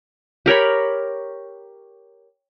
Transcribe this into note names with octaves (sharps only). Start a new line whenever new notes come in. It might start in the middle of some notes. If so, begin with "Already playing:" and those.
G4 A#4 C#5 B5